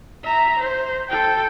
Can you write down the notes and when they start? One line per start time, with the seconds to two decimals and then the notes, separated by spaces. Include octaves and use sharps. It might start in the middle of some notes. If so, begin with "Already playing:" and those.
0.24 E5 A#5
0.59 C5
1.09 A4 G5